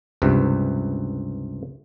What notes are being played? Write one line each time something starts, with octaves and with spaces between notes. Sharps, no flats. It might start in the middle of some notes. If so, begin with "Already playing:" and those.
C#2 G2 C3